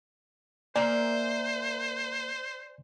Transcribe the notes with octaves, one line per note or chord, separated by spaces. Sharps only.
A#3 C5 D5 E5 G#5